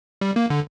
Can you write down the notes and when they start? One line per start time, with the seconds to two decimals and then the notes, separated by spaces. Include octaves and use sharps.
0.21 G3
0.36 A#3
0.50 D3